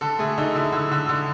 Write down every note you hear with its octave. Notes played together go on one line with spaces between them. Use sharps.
D3 A4
A3 G#4
D3 D#4
D3 E4
D3
D3
D3